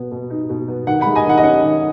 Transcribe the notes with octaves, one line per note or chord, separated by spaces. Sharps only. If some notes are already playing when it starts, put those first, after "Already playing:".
Already playing: B2 B3
B2
D#4
B2
B3
D#3 F#5
G#3 F#5 B5
D#5 G#5
D#3 F#5
D#5
C#4 F#5
D#3